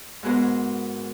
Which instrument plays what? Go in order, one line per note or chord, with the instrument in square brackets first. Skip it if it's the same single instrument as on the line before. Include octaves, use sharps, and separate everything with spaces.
[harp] G#2 B3 F#4 G#4 A#4 C5